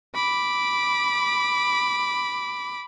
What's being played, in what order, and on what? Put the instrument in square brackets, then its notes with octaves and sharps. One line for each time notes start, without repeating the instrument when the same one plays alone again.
[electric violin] B5 D6